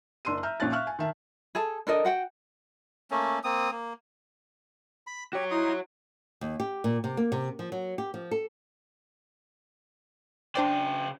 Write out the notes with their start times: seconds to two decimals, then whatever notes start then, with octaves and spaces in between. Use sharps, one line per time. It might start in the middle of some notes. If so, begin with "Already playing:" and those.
0.25 F#1 D4 C6 E6 D#7
0.43 E5 A#5 F6 G6
0.60 A#1 A#2 C#4 F4 F#6 A6
0.72 E5 F5 C#6 F6 F#6
0.87 G#5
0.99 D#3 E5 A5
1.55 G#4 A4 A5
1.87 D4 A4 A#4 D#5
2.05 F#4 F#5 G5
3.11 A3 A#3 C#4
3.44 A#3 C4 D#6
3.71 A#3
5.07 B5
5.33 F#4 G4 C#5
5.51 D#4 E4 C6 D#6
6.41 D#2
6.60 G4
6.84 A#2
7.04 C3
7.17 A#3
7.32 C3
7.59 F3
7.72 F#3
7.98 G4
8.14 F3
8.31 A4
10.55 C#3 D4 C5 D5 G5